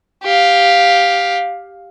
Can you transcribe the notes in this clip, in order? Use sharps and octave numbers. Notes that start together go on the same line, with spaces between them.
G4 F5